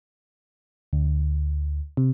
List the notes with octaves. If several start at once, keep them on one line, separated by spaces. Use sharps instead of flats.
D2
C3